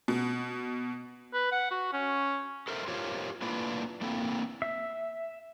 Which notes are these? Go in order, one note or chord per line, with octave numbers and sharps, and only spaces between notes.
B2
B4
F#5
F#4
C#4
A4 A#4 C5 E5
F4 G4 A#4 C5 C#5 F5
A3 A#3 D4 E4 F4 B4
A3 A#3 C4 E4 A4
E5